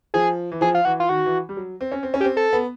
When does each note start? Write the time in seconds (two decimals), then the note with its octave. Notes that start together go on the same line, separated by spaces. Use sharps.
0.14 F3 G#4
0.52 E3
0.61 F3 G#4
0.75 F4
0.85 E3 F#4
1.00 F4
1.09 D#3 F#4
1.26 E3
1.49 G3
1.57 F#3
1.81 C4
1.92 C#4
2.03 C4
2.14 C#4
2.21 G4
2.24 C4
2.37 A4
2.53 B3